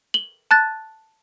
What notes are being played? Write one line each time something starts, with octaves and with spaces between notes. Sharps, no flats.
F#7 G7
A5 F#6 A6